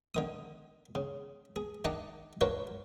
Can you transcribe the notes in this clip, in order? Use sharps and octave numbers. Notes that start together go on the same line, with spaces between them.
D3 D#3 D#6
C#3
G#4
D#3 D4 D#4 D5 F#5 A5
D4 F4 F#4 A#4 B4 C#5